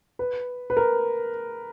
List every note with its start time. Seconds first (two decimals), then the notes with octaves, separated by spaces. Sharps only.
0.19 B4
0.70 B4
0.77 A#4